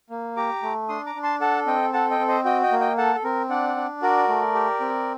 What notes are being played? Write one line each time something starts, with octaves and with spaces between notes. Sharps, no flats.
A#3
G4 A#5 D6
A3
D4 C6 D#6
A#5 D6
D4
A5 C6
A4 F#5 A5
C4 D#5 G5
A4 F#5 A5
D#5 G5
C4
C5 D#5
F#4 D#5 G5
D#5 G5
A#3
D#5 G5
A4 F#5 A5
A4
C4 A#4
D4 D5 F#5
D4
F#4 A#4 D5
A3
G4
C4